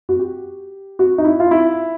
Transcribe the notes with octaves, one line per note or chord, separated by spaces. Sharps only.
F#4
G4
F#4
D#4
E4
F4
E4